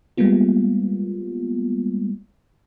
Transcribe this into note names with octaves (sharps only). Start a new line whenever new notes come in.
G3 G#3 A#3 B3 F4